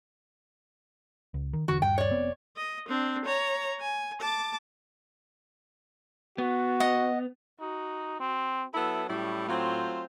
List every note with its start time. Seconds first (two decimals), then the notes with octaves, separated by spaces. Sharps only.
1.34 C#2
1.53 D#3
1.68 E1 D3 E3 F#4
1.82 D#1 G2 G5
1.98 C#5 D5
2.11 F1 B3 C4
2.57 D#5
2.89 C4 D4
3.25 C#5 A#5
3.80 G#5
4.20 A5 D6
6.38 B3 F#4
6.80 D#5 F#5
7.60 D#4 F#4
8.20 C4
8.74 F#3 B3 E4 A4
9.10 A2 G3 C#4 E4
9.48 F#3 A3 C4 F4 C5